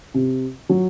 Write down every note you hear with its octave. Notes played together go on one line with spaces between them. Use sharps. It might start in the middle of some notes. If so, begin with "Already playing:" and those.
C3
F#3